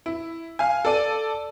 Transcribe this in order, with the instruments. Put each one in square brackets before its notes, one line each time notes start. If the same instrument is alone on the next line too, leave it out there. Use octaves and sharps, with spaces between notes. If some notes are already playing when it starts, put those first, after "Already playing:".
[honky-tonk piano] E4
F5 G#5
A4 D5 D#7